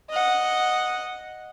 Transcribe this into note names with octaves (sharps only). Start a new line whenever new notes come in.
D#5 F#5